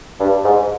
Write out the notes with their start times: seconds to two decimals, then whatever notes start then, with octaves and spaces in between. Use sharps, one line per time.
0.20 G2
0.44 G#2